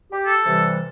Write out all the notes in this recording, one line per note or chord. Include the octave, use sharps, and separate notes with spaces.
G4
A4
C3 E3 G3